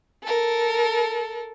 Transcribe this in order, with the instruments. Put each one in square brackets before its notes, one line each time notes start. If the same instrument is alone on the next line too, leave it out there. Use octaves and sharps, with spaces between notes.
[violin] A4 A#4